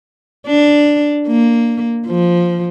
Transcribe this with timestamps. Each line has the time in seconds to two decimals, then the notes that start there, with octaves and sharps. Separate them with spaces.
0.47 D4
1.27 A#3
2.07 F3